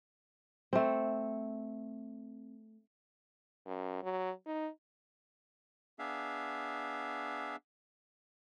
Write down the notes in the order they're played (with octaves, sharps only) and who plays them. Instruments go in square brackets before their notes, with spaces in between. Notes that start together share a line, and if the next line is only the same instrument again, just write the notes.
[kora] A3 C4
[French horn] F#2
F#3
D#4
[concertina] B3 D4 G#4 E5 F5